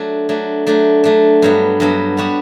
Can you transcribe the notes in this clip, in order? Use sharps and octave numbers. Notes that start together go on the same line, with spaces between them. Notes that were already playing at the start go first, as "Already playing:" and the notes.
Already playing: F#3 A3 D4
F#3 A3 D4
F#3 A3 D4
F#3 A3 D4
G2 F#3 B3
G2 F#3 B3
G3 B3 D4 F#4